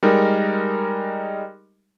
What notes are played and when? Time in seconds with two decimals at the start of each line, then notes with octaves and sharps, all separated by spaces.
0.03 G3 G#3 D#4 A#4